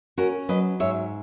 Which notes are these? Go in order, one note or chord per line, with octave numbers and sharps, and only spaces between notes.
C#4 F#4 A#4
F#3 B4 D#5
G#2 C#5 E5